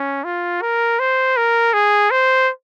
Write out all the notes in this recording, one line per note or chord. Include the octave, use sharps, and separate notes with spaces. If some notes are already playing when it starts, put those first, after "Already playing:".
Already playing: C#4
F4
A#4
C5
A#4
G#4
C5